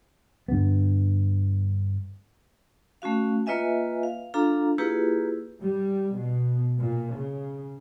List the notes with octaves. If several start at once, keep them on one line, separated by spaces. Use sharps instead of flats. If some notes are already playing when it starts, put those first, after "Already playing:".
G2 D3 G3 B3
A3 C#4 F#4 F5
A#3 F4 B4 D#5 E5 G#5
F5
D4 F4 A4 F5 A#5
A#3 E4 F4 G4 G#4 B4
G3
B2
A#2
C#3